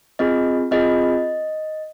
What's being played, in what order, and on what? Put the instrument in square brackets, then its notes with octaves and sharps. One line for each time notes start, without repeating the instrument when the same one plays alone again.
[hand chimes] C4 F4 G#4 D#5
C4 F4 G#4 D#5